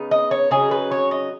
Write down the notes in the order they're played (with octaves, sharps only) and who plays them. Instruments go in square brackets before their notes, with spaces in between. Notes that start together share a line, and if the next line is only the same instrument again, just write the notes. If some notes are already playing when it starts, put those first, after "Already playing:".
Already playing: [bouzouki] C#3 B3 D#4
D#5
C#5
C#3 F#3 D#4 G#4
B4
C#5
D#5